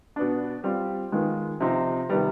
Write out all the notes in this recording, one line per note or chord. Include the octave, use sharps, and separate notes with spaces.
B2 B3 D4
G3 C4 F4
D#3 G#3 B3 F4
C3 F3 C4 D#4
C3 D#3 G3 B3